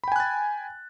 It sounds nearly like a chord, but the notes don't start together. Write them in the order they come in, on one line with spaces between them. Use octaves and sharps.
B5 G5 G#5 F#6 A6